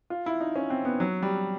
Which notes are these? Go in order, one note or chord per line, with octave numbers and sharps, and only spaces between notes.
F4
E4
D#4
C#4
C4
B3
F#3
G3